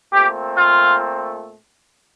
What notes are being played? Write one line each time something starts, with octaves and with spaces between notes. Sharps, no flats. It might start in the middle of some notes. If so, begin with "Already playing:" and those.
A#2 A3 C4 G4
F4